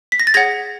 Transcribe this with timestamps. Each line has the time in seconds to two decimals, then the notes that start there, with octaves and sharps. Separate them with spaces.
0.12 B6
0.20 A#6
0.27 A6
0.34 G#4 C#5 F#5 G#6 A#6